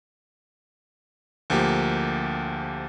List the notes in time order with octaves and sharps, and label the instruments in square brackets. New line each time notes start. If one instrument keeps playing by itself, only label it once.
[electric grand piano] D2 F3 A#3 G4